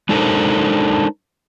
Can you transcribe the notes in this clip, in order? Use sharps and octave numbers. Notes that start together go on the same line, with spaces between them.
G#3 D4 D#4 A4 A#4 C5